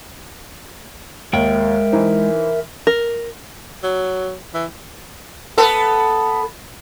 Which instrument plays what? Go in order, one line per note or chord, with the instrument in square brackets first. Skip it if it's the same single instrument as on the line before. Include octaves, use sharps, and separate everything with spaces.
[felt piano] D#2 [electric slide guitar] G#3 G5 [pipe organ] A#4 E5
[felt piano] E3 D#4 C5
[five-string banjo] A#4
[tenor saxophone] F#3
E3
[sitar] B3 A4